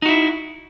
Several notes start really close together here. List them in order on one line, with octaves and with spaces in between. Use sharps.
D#4 F#4 E4